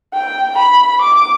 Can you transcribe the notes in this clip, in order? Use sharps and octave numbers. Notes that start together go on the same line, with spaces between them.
G5
B5
D6